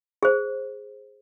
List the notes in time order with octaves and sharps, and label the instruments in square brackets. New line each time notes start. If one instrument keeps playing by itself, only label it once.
[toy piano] G#4 C5